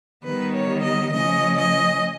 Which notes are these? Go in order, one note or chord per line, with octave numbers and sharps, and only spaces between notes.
D#3 G3 B3 B4
C#5
D#5
C#3 F3 A3 C#4 D#5
D#5